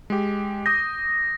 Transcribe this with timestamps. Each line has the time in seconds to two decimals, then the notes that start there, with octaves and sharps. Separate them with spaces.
0.10 G#3 G4
0.66 D6 D#6 G6 A#6